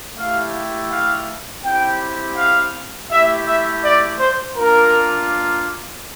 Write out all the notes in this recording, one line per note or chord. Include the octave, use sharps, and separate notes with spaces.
A3 E4 G4 F5
F5
C4 E4 G4 G5
F5
A3 E4 G4 E5
E5
D5
C5
A#3 D4 F4 A#4